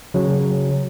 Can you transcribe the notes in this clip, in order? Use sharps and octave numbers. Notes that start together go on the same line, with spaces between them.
C#3 F#3